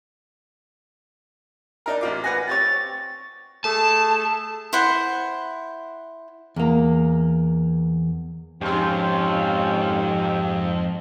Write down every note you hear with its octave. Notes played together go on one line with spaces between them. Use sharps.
D4 D#4 A#4
A1 F4 D6
B4 F#5 G#5 A#6
C4 G4 C#5 A6
A3 G#4 A4 A5
E4 C5 F#5
E2 A#3
F2 G#2 C4 C#4 F4 G4 C5